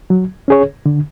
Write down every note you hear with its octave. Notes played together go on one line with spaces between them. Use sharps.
F#3
C#4 G#4 C#5
D3